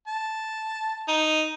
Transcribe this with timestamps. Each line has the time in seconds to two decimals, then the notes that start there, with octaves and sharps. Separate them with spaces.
0.07 A5
1.08 D#4